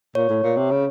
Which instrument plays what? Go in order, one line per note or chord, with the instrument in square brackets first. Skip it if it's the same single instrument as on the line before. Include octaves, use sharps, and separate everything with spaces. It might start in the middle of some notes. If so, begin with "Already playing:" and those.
[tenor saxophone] A#2 [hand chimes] C#5
[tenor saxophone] A2
A#2
C3
C#3